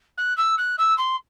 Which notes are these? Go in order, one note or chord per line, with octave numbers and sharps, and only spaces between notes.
F#6
E6
F#6
E6
C6